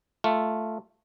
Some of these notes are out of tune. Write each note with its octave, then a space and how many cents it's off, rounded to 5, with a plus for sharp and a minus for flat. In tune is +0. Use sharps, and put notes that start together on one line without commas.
A3 +0 F4 +0